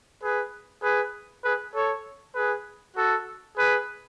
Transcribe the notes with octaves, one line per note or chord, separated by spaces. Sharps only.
G#4 B4
G#4 B4
G#4 B4
A4 C#5
G#4 B4
F#4 A4
G#4 B4